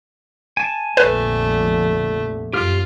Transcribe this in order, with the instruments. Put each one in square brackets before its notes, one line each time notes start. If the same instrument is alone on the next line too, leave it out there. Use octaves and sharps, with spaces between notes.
[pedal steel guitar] G#5 A5
[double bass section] F1 A#1 D3 [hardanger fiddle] A3 [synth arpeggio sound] B4
[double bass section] F#2 [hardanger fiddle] F4 [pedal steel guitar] G4 F6